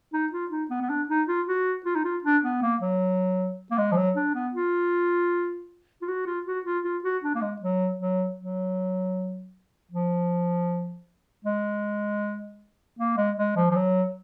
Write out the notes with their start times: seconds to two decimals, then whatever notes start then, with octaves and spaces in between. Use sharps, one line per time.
0.13 D#4
0.32 F4
0.51 D#4
0.70 B3
0.82 B3
0.89 D4
1.09 D#4
1.28 F4
1.47 F#4
1.85 F4
1.96 D#4
2.04 F4
2.24 D4
2.44 B3
2.62 A#3
2.81 F#3
3.71 A#3
3.78 G#3
3.92 F3
3.97 F#3
4.16 D4
4.34 B3
4.54 F4
6.02 F4
6.08 F#4
6.26 F4
6.46 F#4
6.66 F4
6.84 F4
7.04 F#4
7.24 D4
7.35 A#3
7.42 G#3
7.62 F#3
7.99 F#3
8.39 F#3
9.91 F3
11.45 G#3
12.99 A#3
13.17 G#3
13.38 G#3
13.56 F3
13.71 F3
13.76 F#3